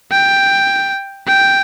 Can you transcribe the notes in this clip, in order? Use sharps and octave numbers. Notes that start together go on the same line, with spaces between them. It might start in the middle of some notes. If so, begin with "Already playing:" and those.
G5
G5